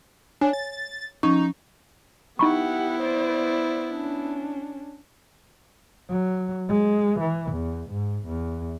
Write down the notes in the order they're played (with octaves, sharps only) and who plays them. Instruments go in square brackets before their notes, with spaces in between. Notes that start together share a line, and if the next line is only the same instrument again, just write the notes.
[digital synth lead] D4 [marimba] C#5 G#5
[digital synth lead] A6
[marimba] F3 C#4 C#6 [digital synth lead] D#4
[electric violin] B3 E4 [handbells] D#4 B5 C#6 [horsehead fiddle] G4 F#5
[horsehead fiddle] C5 D5
C#4 D4
[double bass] F#3
G#3
E3
E2
G#2
E2